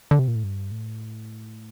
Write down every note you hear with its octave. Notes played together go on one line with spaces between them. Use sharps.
D3
C3
A#2
A2
G2
A2